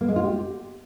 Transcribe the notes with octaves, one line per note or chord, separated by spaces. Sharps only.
A#3
G#3
F4
G4